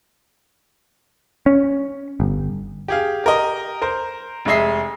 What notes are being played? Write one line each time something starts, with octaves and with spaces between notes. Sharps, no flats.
C#4
G1
G4 G#4 F5
G4 A#4 D#5
A#4 C5
F1 G#3 G#4 D#5 E5 C7